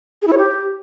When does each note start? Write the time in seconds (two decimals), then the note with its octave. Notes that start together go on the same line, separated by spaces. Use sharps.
0.22 G#4
0.27 E4
0.33 C#5
0.38 G4